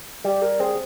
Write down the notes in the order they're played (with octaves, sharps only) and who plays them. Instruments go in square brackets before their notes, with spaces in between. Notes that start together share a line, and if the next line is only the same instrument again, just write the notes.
[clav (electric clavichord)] G3 [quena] G4
[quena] A#4
[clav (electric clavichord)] C4 [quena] G#4